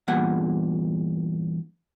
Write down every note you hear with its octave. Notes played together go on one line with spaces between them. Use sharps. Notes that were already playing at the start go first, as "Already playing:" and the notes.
E2 G2 A#2 F#5